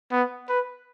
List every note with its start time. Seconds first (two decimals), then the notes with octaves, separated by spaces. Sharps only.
0.12 B3
0.49 B4